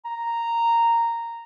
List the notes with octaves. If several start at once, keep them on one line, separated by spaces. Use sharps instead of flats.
A#5